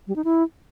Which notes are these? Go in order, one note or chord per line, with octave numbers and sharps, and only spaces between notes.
G3
D#4
E4